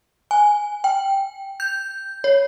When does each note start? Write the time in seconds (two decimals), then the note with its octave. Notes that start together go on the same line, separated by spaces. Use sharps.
0.31 G#5
0.84 G5
1.60 G6
2.24 C#5